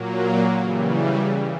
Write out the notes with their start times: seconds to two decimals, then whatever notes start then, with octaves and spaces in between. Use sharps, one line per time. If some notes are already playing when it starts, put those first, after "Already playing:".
Already playing: A#2 F#3 A#3
0.55 C#3 E3 G3